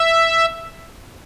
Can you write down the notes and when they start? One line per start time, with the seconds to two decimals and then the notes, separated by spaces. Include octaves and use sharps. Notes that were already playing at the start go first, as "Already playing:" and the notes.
Already playing: E5